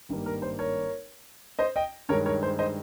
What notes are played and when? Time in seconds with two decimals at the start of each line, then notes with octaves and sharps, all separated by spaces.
0.09 G#1 G2 G3 A#3
0.26 A#4
0.42 C5
0.59 A#4 C#5
1.59 C5 D#5
1.76 D#5 G5
2.09 G2 D#3 G#3 A#4 C#5
2.26 A#4 C#5
2.43 C5
2.59 C5 D#5